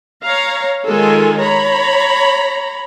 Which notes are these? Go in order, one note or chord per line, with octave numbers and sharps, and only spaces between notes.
C#5 F5 A#5
D#3 G#3 F4 A4 G#5
C#5 A#5 B5